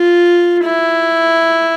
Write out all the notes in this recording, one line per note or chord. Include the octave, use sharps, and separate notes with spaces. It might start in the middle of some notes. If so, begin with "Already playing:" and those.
Already playing: F4
E4